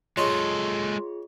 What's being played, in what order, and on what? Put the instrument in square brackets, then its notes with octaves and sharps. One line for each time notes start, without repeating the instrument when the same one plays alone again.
[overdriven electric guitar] G#3 A4 [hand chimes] F4 G#4 [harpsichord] C#5 D#5 [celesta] C6